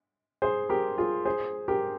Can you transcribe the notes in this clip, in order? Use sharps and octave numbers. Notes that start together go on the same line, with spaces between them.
G#4 C5
G4 A#4
F4 G#4
G#4 C5
G4 A#4